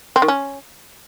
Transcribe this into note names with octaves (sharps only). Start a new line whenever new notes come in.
C4
D#3
C#4